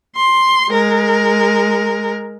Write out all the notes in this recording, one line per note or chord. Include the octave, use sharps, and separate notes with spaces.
C6
G#3 A#4